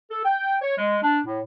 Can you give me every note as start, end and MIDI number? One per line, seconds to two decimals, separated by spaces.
0.11 0.21 69
0.25 0.57 79
0.61 0.78 73
0.78 0.97 56
1.03 1.19 62
1.26 1.40 45